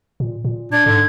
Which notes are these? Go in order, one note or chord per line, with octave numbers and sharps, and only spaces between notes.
A#2
A#2
D4 G#6
G#2 D3